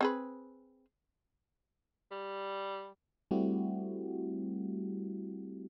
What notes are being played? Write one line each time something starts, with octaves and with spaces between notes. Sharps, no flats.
C4 G#4 B4
G3
G3 A3 C4 E4 F#4 G4